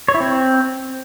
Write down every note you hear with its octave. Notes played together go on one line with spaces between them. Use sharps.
C#5
E4
C4